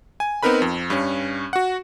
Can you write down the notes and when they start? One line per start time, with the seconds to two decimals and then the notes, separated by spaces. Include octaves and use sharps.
0.20 G#5
0.43 B3 C4 D#4 A#4 B4 B5
0.62 F2
0.90 G2 C#4
1.53 F#4 F#5